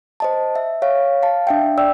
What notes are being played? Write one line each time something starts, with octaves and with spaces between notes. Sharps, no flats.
C5 D#5 A5
E5
C#5 F5
F5 A5
D4 E5 G5
D5 G5 E6